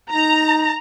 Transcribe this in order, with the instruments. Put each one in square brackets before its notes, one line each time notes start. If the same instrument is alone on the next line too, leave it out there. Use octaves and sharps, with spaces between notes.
[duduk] D#4 [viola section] A#5